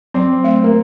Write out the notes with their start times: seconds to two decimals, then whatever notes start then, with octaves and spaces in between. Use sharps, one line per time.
0.14 F#3 C4
0.44 A3
0.64 A#3